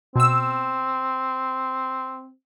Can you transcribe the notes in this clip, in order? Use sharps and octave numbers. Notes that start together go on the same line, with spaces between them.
B2 C4 E6